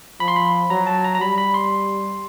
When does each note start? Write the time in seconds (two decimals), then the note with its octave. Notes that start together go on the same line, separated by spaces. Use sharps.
0.20 F3 B5
0.28 C6
0.36 B5
0.70 F#3 A#5
0.87 A5
1.04 A#5
1.15 A#5
1.21 G3 B5
1.38 B5
1.54 C6